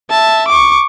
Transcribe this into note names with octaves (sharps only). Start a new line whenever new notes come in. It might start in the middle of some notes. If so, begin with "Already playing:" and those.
E5 A5
C#6 D6